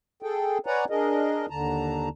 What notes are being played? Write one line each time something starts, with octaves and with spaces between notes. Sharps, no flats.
G#4 A4 G5
B4 C#5 D5 F#5 G#5 A#5
D4 G#4 A#4 D#5
D#2 D3 A5 A#5